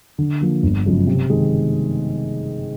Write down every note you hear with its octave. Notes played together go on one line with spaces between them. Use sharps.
D3
F3 A#3
G1
F#2 C#3 F3 G#3
C3
D#3 G#3